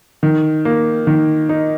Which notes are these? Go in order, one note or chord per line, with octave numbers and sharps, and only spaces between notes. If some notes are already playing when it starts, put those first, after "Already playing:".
D#3
A#3
D#3
D#4